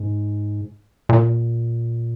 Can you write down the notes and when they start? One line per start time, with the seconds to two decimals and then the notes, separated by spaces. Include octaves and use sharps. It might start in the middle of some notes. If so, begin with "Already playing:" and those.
Already playing: G#2
1.09 A#2